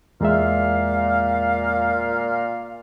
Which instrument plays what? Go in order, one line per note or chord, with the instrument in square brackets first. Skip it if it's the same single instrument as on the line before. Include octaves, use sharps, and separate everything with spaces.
[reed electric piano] E2 G#3 E5 [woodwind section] A#2 F5